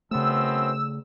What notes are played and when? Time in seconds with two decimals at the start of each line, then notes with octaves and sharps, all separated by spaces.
0.11 F#2 C#3 A3 B3 C4 E6